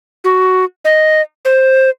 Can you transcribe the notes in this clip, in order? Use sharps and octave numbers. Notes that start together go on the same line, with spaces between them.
F#4
D#5
C5